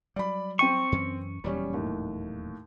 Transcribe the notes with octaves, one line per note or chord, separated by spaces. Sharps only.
F#3 G3 D5 B5
C4 G5 C#6 D#7
F#2 E3 C#4
D#1 E2 F#3 G3 C#4
D#2 A2